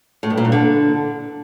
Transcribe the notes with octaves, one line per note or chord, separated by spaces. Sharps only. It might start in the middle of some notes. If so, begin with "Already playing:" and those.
A2
G2
A#2
G2
D3